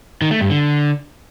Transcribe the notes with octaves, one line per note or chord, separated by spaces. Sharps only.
D#3
A3
G2
D3